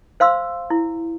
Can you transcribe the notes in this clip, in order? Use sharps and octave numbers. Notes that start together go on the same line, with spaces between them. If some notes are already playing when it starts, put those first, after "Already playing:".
C5 F5 C6 E6
E4